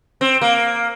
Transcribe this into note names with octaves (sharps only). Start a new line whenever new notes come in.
C4
A#3